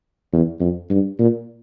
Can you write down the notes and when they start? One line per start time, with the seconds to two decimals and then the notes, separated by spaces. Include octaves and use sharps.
0.32 E2
0.60 F2
0.90 G2
1.19 A#2